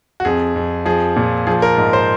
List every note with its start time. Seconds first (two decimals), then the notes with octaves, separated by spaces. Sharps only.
0.20 F#4
0.25 F2 G#4
0.56 F2
0.85 F3 G#4
1.16 A#2
1.47 F3 G#4
1.62 A#4
1.77 G#2
1.93 C5